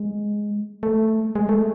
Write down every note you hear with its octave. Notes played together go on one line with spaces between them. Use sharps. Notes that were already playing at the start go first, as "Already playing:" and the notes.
Already playing: G#3
A3
G#3
A3